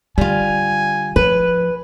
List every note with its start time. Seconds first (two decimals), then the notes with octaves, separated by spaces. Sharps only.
0.18 D3 G3 F4 G#5
1.16 F3 B4